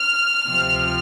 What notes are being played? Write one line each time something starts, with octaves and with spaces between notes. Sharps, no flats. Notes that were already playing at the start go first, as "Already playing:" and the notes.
Already playing: F6
D2 C3 F3